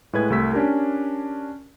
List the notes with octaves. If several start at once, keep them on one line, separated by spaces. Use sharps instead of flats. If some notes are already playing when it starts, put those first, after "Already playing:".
A2 G#3 B4 G#6
C2 A3 G4 E6 B6
C#4 D4 G4 A#4